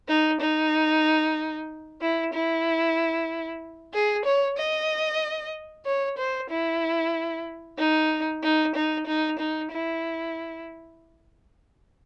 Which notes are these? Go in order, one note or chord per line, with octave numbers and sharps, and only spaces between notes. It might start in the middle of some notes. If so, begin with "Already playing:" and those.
D#4
D#4
E4
E4
G#4
C#5
D#5
C#5
C5
E4
D#4
D#4
D#4
D#4
D#4
E4